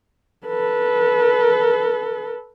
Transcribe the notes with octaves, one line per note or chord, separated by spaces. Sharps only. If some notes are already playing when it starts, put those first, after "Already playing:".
A4 B4